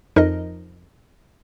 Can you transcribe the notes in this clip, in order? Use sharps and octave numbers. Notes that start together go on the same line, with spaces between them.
F2 F3 D#4 A#4 D#5